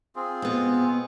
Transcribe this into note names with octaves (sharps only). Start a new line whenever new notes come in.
C4 F4 G#4
B2 B3